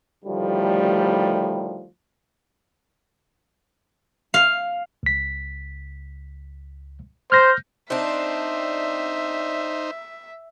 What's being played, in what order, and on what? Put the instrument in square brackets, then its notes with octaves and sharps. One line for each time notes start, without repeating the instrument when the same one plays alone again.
[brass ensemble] D2 A2 D#3 F3 G3
[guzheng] F5
[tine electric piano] C#2 B6
[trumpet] C5 [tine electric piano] F6 G6 A#6
[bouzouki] C4 D4 [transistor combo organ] D#4 C5 [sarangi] E5